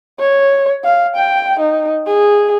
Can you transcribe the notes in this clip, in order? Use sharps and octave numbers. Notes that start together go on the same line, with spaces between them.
C#5
F5
G5
D#4
G#4